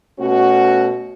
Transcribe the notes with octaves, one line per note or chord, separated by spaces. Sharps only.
B2 A3 C#4 F#4